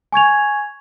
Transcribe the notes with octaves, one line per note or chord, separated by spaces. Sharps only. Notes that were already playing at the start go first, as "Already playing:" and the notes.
G#5 C#6 G#6 F7